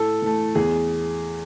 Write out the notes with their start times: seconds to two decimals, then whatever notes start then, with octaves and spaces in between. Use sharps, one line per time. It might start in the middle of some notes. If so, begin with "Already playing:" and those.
Already playing: A2 A4
0.22 E3 A3
0.55 E2 G#4